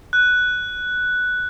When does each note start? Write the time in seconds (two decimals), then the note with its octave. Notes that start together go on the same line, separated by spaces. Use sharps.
0.13 F#6